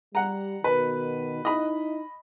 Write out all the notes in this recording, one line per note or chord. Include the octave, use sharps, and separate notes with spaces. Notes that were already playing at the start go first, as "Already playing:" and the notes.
G3 F#5 A#5
B2 D#3 B4
D#4 E4 D#5 B5